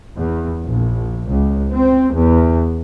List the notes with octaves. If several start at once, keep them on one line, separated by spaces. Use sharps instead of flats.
E2
A#1
C#2
C4
E2